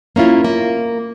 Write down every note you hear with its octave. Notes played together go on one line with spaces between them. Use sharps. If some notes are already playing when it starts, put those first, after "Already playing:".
A#3 C#4 E4 F4
A#3